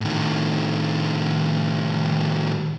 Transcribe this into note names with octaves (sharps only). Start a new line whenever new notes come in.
A2 D#3